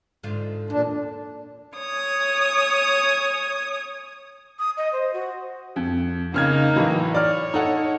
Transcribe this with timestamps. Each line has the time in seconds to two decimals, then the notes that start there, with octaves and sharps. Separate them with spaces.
0.23 G#2 D3 F4
0.70 E2 A#2 D4
1.78 C#5 D#6
4.59 D#6
4.77 D#5
4.93 C5
5.13 F#4
5.76 F2
6.34 C#3 A#3 D#4 F6 G#6
6.76 A2 E3 F#3
7.15 C#5 D5 F6
7.54 D#4 A4 F#5